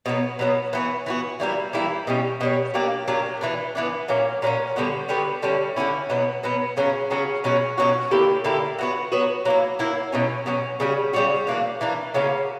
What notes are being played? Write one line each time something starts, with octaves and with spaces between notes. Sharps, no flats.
B2 F#3 B3
B2 F#3 B3
E3 B3 F#4
E3 B3 F#4
E3 G3 A#3 E4
E3 G3 A#3 E4
B2 G3 C#4
B2 G3 C#4
F#3 A#3 D4 G4
F#3 A#3 D4 G4
E3 B3 D4
E3 B3 D4
A#2 F#3 A#3 C#4
A#2 F#3 A#3 C#4
D3 G3 B3 F#4
D3 G3 B3 F#4
D3 G3 C#4 E4
D3 G3 C#4 E4
B2 F#3 B3
B2 F#3 B3
C#3 F#3 C#4 F#4
C#3 F#3 C#4 F#4
B2 F#3 C#4 F#4
B2 F#3 C#4 F#4
D3 A#3 E4 G4
D3 A#3 E4 G4
F#3 B3 F#4
F#3 B3 F#4
F#3 A#3 E4
F#3 A#3 E4
B2 F#3 C#4
B2 F#3 C#4
C#3 G3 C#4 F#4
C#3 G3 C#4 F#4
E3 A#3 D4
E3 A#3 D4
C#3 F#3 A#3 C#4